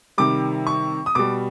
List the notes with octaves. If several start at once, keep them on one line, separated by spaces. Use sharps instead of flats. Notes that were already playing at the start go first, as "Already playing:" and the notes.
C3 D#3 G3 D6
C#6
D#6
B2 G3 D6